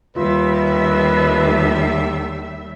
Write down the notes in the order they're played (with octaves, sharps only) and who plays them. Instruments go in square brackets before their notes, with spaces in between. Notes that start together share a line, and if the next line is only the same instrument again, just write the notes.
[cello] D#2 [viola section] G3 E5 [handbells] F4 [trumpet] B4